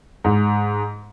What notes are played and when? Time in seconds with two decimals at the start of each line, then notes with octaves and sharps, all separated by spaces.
0.24 G#2